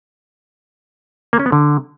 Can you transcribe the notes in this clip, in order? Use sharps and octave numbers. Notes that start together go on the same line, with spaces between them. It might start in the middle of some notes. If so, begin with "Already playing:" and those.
A#3
C#4
B3
D3